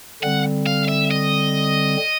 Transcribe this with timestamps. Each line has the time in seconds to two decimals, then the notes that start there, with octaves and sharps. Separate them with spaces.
0.23 D3 G3 C4 F#5
0.66 F5
0.88 E5
1.11 D#5